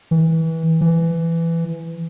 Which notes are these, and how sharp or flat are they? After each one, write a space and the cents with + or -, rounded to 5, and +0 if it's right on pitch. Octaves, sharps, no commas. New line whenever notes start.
E3 -20
E3 +15